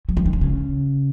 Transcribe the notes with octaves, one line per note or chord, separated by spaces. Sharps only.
F#3
F3
D#3
D3
C#3